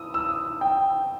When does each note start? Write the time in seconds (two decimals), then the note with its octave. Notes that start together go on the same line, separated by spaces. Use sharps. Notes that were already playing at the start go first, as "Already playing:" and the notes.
Already playing: D#6 E6
0.14 E6
0.61 G5